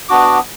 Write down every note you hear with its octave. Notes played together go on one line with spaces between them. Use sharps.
B3 D4 F#4 D6